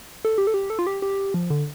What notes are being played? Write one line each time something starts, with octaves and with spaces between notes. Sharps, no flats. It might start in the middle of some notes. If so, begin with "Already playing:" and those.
A4
G4
A4
G4
A4
F4
G4
G4
F3
D3